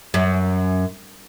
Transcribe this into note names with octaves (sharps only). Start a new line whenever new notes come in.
F#2